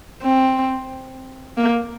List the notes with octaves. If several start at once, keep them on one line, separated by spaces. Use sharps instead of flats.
C4
A#3